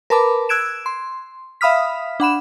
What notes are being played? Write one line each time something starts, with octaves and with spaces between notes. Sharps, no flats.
A#4 B4 A5 B5 D6
E6 F#6 G#6 D7 E7
C6
E5 F5 B5 D#6 F6 B6
D4 F#5 B5 E7